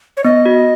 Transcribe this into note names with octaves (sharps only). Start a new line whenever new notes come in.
C#5
B3 D#5
F#4